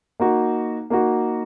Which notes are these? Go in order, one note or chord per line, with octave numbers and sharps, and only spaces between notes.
A#3 D#4 F#4
A#3 D#4 F#4